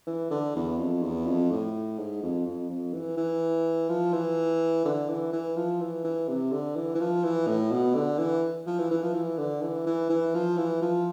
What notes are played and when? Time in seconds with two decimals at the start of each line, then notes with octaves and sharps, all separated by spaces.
0.07 E3
0.31 D3
0.56 E2
0.79 F2
1.03 E2
1.26 F2
1.51 A2
1.98 G#2
2.23 F2
2.47 F2
2.70 F2
2.94 E3
3.17 E3
3.89 F3
4.13 E3
4.85 D3
5.09 E3
5.33 E3
5.56 F3
5.81 E3
6.04 E3
6.29 C3
6.52 D3
6.76 E3
6.95 E3
7.00 F3
7.24 E3
7.47 A2
7.72 B2
7.95 D3
8.19 E3
8.66 F3
8.79 E3
8.91 E3
9.03 F3
9.14 E3
9.38 D3
9.62 E3
9.86 E3
10.10 E3
10.34 F3
10.57 E3
10.82 F3